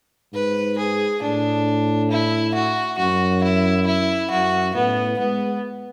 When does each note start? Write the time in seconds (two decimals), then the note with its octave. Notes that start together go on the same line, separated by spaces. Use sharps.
0.33 G#2 B4
0.78 G#4
1.22 A2 D4
2.11 E4
2.54 F#4
2.98 F#2 F#4
3.43 E4
3.86 E4
4.30 F#2 F#4
4.75 A2 B3
5.19 G#3 B3